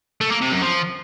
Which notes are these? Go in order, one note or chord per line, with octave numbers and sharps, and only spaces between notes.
A3
A#3
C3
F#2
F3